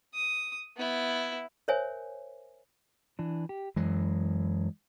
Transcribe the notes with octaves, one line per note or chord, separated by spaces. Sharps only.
D#6
B3 E4
A#4 C5 C#5 E5 G#5
E3 D4
G4
F#2 E3 G#3